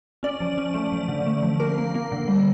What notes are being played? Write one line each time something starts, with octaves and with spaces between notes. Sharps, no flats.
C#4 D5
F3
C#4
A3
F3
D3
A3
F3
A#3 A#4
A#3
A#3
D3
G3